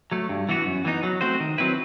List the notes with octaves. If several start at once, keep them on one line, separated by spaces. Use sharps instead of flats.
F#3 A3
G2
E3 B3 F#4
F#2
E3 B3 D#4
F#3
A3 C4 F#4 C5
D#3
F#3 C4 E4 B4